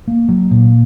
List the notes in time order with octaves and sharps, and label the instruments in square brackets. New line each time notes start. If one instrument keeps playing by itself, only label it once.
[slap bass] A#3
F#3
A#2